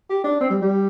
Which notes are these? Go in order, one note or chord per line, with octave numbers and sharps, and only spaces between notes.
G4
D4
C4
G3
G3